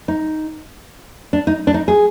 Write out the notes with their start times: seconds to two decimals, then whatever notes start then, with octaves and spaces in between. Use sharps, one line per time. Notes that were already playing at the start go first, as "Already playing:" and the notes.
0.08 D#4
1.33 D4
1.47 D#4
1.67 D4
1.74 D#4
1.88 G#4